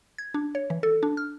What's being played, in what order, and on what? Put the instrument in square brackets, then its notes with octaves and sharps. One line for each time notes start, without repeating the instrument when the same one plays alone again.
[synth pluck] G#6
D4
C#5
E3
A4
D4
F6